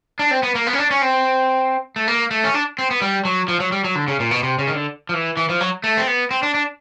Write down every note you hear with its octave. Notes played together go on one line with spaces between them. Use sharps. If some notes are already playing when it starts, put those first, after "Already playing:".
D4
C4
B3
A#3
B3
C#4
D4
C#4
C4
A3
A#3
A3
C#4
D4
C4
B3
G3
F#3
F3
F#3
G3
F#3
D3
C#3
A#2
B2
C3
C#3
D#3
D3
F3
E3
E3
F3
F#3
A3
C4
B3
C4
D4
D4